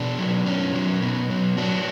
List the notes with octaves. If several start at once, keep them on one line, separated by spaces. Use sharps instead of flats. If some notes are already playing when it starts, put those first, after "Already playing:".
Already playing: B2 D4
F#3
B2 C#4
F#3
B2 B3
F#3
F#3 D4